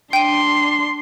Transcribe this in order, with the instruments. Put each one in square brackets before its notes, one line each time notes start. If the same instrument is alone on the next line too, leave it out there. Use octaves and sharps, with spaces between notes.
[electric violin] D4 C6 [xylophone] G5 D#7